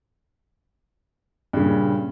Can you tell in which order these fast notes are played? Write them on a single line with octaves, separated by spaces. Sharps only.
G2 C#3 A#2